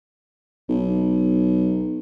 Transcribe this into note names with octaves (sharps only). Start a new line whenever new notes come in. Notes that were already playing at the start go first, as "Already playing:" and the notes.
B1